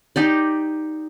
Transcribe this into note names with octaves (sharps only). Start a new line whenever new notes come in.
D#4 G4 D5